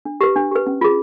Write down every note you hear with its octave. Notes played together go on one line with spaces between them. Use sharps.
D4
G4 B4
D4
G4 B4
C#4
F4 G#4